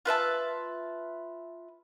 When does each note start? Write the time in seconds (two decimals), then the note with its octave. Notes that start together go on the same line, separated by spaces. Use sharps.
0.05 F4 B4 E5 A5